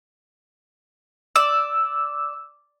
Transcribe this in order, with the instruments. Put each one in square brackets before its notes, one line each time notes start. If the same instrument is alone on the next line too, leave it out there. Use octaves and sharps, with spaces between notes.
[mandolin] D5 [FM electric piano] E6